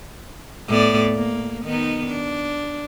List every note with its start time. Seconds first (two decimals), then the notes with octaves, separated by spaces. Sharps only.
0.68 A2 B3 D5
1.15 A#3
1.64 D#3 B3 D#4
2.07 D4